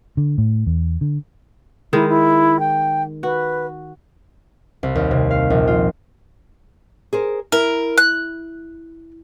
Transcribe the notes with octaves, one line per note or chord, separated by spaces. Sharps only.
D3
A2
E2
D3
D#3 G#3 E4
E4
G5
F#4 B4
C2
D#2
C3
F5
A#1
F4
G#4 A#4 C5
E4 A#4
F#6